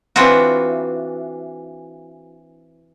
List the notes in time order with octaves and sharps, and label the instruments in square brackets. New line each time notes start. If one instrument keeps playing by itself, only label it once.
[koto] E3 C4 D4 F4 F#4